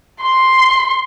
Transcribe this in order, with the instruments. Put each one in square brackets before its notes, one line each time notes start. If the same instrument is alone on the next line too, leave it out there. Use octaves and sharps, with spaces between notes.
[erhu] C6